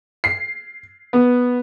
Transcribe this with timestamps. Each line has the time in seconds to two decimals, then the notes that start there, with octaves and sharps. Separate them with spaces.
0.24 C7
1.13 B3